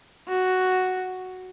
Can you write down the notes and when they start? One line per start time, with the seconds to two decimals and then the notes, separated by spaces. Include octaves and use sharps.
0.28 F#4